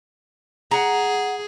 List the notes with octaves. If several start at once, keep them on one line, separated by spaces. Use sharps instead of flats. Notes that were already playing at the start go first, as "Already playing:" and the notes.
G#4 F#5 A#5